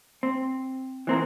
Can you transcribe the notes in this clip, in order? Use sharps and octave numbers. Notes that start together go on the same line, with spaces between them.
C4
E3 C4 A#4